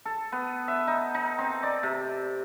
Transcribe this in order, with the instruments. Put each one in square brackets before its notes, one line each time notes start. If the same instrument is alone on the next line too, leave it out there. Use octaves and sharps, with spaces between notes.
[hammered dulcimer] A4
B3
E5
D#4
D#4
C4
D5
C3